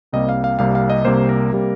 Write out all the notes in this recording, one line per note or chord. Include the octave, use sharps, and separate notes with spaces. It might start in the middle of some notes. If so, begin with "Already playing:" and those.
C2 C3 G3 A#3 D#5
F5
F5
C2 C3 G3 A#3 F5
F5
D#5
C2 C3 G3 A#3 C5
A#4
C3 G3 A#3